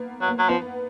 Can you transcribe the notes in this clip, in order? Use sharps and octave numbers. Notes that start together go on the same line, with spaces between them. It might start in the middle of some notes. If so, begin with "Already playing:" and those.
Already playing: A#3 B3
F#3
A#3
F#3
F3 B3